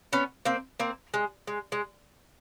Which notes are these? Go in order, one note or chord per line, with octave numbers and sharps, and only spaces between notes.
B3 C#4
A#3 C4
A#3 C4
G#3
G#3
G#3